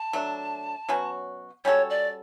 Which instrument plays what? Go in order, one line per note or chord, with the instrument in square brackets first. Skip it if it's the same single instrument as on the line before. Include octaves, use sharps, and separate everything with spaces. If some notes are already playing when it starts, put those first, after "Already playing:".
Already playing: [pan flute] A5
[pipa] F#3 A3 D4
B2 F#3 C#4 F#4
[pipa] G3 C#4 F#4 A4 [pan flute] C#5
[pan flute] D5